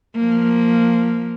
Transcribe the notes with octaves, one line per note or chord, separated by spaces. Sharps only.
F3 A#3